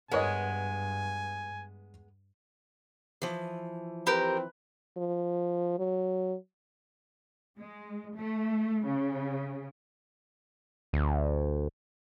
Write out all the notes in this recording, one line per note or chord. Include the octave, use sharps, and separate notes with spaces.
G2 G#3 B3 A#4 C#5 D#5 G#5
E3 F3
C4 G4 A#4 B4
F3
F#3
G#3
A3
C#3
D2